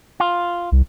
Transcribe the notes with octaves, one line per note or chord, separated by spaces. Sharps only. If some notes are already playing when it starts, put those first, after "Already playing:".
F4
C2